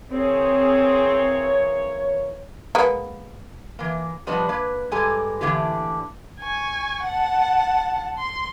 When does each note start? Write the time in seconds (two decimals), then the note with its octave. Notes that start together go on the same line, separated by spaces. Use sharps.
0.11 E3 A#3 C4 G#4 C#5
2.75 G#3 A#3 B3
3.79 E3 A#3
4.27 F3 G3 B3 D4 D#5
4.49 A#3 B4
4.92 G2 G#3 G4 A4 G#5 A#5
5.41 A2 D3 E3 A#3 B3 G4
6.40 G#5 C#6
7.04 F#5 A5
8.19 C6